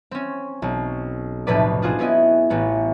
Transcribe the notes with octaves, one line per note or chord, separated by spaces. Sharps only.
C4 C#4
B1
F1 B1 A2 C3 B4 D5
D4 F4 F#4 G#4 C5
B3 C#4 E4 D#5
A1 B3